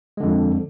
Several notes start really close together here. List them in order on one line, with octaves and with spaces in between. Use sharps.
G#3 D3 F2